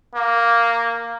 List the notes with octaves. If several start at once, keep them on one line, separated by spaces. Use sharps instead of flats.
A#3